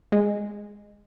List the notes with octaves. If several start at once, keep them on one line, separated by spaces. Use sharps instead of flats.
G#3